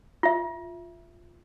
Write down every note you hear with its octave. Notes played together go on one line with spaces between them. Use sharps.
F4 E5